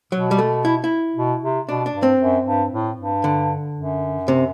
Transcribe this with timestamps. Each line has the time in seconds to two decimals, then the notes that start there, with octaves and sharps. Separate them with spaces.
0.12 B2 F#3
0.31 G3
0.38 A3
0.65 E4
0.84 E4
1.16 B2
1.42 C3
1.68 B2 D4
1.86 D4
1.94 G2
2.03 C4
2.20 F#2
2.46 G2
2.72 A2
2.98 G2
3.24 D3
3.76 F#2
4.28 C3